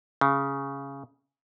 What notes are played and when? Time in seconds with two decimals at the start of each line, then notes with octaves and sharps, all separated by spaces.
0.21 C#3